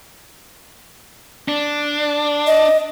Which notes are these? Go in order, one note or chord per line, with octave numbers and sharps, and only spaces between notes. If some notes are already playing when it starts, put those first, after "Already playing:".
D4
D#5